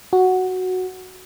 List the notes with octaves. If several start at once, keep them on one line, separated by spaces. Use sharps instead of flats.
F#4